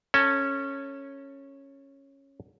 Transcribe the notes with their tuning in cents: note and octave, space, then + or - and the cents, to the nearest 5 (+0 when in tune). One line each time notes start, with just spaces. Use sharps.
C#4 -10 A4 +20